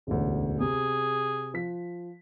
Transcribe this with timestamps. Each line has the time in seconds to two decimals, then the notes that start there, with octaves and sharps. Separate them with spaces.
0.07 E1 A1 D2
0.61 C3 G#4
1.54 F3 B6